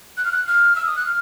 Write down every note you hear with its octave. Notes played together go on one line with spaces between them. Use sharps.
F#6
F6
F#6
F6
E6
D#6
F#6
F6